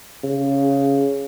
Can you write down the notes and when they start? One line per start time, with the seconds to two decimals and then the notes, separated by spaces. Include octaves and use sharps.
0.24 C#3